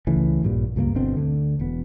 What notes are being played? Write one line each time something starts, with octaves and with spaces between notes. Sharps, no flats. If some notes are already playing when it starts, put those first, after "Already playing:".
C#2 C#3 E3 A3
A#1 G2 A#2
C#2 G2 A3 A#3
G1 B2 D3 C4
D2 D3
E1 B3